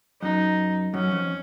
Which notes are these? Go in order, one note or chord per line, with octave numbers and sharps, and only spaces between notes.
F#2 D#4
F#2 C#4
F2